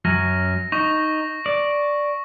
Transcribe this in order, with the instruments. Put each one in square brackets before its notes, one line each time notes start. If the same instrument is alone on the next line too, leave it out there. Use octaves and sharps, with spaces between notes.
[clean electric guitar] F#2 F#3 C#4 [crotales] A#6
[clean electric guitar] D#4 [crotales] C#6
[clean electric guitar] D5